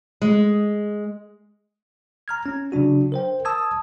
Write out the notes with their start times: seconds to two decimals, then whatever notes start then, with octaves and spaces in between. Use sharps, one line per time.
0.22 G#3
2.28 A#5 F6 G#6
2.46 C#4
2.72 C#3 F#3 D4 F#4
3.12 A#4 C5 G5
3.45 A5 D#6 E6 G#6